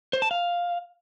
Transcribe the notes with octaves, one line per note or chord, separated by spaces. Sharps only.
C5
A5
F5